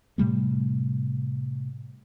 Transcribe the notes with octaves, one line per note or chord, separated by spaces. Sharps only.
A2 C3 G3 A3